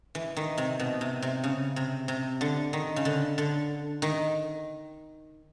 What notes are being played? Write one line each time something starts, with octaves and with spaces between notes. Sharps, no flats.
E3
D#3
C3
B2
C3
C3
C#3
C3
C3
D3
D#3
C#3
D3
D3
D#3